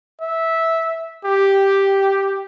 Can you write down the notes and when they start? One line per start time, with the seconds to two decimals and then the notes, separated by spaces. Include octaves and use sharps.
0.21 E5
1.25 G4